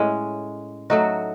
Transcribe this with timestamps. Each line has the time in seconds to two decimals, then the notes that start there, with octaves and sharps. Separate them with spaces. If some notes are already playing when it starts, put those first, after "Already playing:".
Already playing: A2 G#3 C#4
0.90 F#3 A3 D#4 F#4